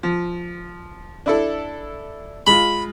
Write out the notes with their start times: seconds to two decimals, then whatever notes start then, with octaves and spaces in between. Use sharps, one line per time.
0.03 F3
1.26 D4 E4 A4
2.47 G#3 F4 B5